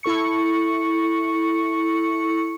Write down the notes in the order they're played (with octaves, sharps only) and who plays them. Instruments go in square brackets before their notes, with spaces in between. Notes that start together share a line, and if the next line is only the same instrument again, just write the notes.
[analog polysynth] E4 A4 C#6 C#7